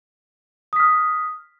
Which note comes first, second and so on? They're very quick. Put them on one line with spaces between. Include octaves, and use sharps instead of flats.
D#6 B6 F6